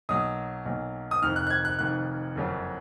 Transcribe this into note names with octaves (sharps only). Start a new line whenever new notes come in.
B1 A#2 F#3 D#6
B1 A#2 F#3
D#6
F1 F2 D#3 F6
F#6
F#6
G#6
F#6
F1 F2 D#3 F#6
F#1 F2 C#3 F#3